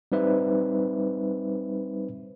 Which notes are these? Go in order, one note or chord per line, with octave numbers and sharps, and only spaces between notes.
G3 C4 D#4 B4 C5 E5